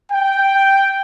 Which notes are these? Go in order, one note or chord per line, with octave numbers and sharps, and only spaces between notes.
G5